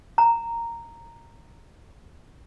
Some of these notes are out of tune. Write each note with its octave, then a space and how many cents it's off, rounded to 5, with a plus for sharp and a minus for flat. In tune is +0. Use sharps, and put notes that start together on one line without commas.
A#5 -10